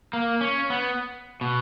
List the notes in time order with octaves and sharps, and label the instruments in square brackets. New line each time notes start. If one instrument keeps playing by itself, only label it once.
[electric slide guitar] A#3
C#4
B3
B2